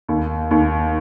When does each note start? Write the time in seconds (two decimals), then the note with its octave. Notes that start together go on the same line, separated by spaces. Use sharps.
0.09 D#2
0.51 D#2